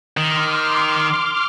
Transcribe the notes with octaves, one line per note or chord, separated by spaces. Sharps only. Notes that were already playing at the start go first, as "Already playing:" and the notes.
D#3 C6 D6 F6